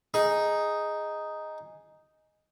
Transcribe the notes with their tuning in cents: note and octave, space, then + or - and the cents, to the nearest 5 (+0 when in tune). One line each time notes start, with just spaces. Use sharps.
D#4 +0 G#4 +0